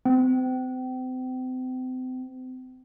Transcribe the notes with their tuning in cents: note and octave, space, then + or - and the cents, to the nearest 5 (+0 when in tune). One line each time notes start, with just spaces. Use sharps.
C4 -35